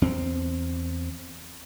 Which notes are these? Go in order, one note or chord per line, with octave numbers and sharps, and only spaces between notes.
E2 C4